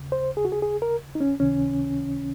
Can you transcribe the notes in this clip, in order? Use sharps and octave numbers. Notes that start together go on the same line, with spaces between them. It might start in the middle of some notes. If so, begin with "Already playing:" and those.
Already playing: D#2 C#3
C5
G#4
F#4
G#4
G#4
A#4
D#4
C#4
C#2 C3 D#3 C#4